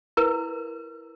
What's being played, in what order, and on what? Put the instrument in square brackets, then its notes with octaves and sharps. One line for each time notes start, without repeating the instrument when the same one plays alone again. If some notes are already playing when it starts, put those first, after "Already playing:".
[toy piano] E4 A#4 B4